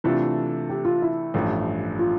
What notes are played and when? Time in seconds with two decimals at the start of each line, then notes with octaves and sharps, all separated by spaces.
0.04 C3 E3 A3 D4 F4 A4
0.69 G4
0.85 F4
1.02 E4
1.34 A1 G2 F3 A3
1.99 F4